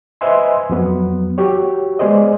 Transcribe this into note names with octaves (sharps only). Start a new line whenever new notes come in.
B4 C5 D#5 E5 G#5 C6
F2 F#3 B3
F#4 G4 C#5
G#3 B3 G#4 C5 D5 D#5